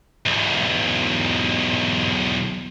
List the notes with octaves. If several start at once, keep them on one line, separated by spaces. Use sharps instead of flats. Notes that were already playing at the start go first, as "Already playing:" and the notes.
B1 E2